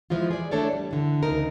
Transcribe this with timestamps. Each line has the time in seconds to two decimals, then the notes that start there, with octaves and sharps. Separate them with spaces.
0.10 E3 F3 G#3 F4
0.31 G#4 D5
0.51 E3 A3 D4 A4 C#5 D5
0.73 G3
0.91 D3 E3
1.23 D2 C#3 D#4 A#4